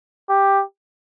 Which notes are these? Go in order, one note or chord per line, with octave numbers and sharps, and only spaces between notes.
G4